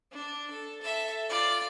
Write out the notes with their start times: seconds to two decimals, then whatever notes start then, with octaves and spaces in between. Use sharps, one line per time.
0.12 D4
0.50 A4
0.81 A4 E5
1.29 F4 D5